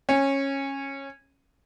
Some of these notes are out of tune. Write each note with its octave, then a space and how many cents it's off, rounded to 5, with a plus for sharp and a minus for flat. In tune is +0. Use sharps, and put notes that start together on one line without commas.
C#4 -15